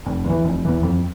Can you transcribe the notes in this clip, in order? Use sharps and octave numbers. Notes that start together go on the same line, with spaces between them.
F1
E2 E3
F1
E2 E3
F2